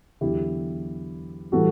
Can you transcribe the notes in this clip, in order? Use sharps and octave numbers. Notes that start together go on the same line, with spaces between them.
E2 D3 F#3 E4 G4
A2 E3 G3 F#4 A4